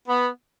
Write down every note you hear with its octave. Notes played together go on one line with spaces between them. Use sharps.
B3